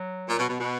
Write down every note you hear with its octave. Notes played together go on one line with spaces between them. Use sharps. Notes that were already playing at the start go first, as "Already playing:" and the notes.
Already playing: F#3
A#2
B2
B2
B2